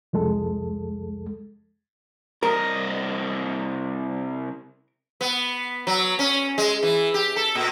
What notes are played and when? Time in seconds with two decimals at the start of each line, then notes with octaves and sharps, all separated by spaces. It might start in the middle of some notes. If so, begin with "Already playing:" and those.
0.13 C2 F2 G#3 A4
2.43 C2 A#4 D#5
5.21 B3
5.87 F#3
6.19 C#4
6.58 G#3
6.83 E3
7.14 G4
7.36 A4
7.55 A#2